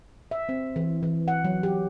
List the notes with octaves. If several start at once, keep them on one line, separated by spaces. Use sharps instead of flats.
E5
C4
E3
E3
F#5
F#3
G4